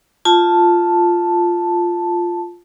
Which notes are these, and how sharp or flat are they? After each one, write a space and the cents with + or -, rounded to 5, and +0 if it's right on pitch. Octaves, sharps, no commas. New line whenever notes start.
F4 +0 A5 +0